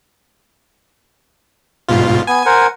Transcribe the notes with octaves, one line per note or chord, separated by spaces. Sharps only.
G#2 B2 F4
B3 G#5
A#4 C5 F#5